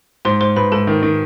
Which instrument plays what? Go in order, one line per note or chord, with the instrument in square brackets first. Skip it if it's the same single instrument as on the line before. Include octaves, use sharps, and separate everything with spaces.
[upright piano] G#2 [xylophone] C5 C6
[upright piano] G#2 [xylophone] C5 C6
[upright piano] G#2 [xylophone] B4 B5
[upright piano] G#2 [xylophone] A4 A5
[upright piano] D#3
D#3